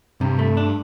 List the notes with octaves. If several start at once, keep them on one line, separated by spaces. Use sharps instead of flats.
G2 C3
A3
D4